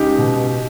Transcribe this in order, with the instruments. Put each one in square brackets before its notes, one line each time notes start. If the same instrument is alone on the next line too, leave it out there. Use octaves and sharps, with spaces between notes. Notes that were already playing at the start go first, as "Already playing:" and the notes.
Already playing: [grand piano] C#2 D#4 G4
B2